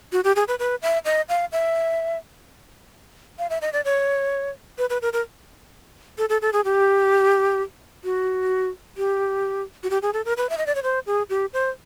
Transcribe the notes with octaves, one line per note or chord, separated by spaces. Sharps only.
F#4
G4
G#4
B4
B4
E5
D#5
F5
E5
F5
E5
D#5
D5
C#5
B4
B4
A#4
A#4
A4
A4
A4
G#4
G4
F#4
G4
F#4
G4
G#4
A4
A#4
B4
E5
D#5
D5
C#5
C5
G#4
G4
C5